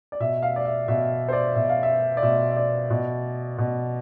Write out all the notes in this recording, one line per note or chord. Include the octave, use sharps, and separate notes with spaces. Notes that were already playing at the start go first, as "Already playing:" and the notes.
D5
B2 E5
F5
D5
E5
B2 E5
C5
D5
B2 E5
F5
E5
D5
B2 E5
E5
D5
B2
B2